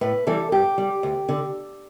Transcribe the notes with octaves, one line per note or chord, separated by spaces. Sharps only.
A2 B4
E3 G3 A4
G2 G4
G3
D2
D3